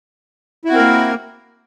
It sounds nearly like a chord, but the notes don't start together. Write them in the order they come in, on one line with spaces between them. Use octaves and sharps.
E4 F#4 C4 A#4 A#3